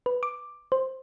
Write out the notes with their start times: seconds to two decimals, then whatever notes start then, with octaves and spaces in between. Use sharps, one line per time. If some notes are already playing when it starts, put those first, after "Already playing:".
0.06 B4
0.23 D6
0.72 C5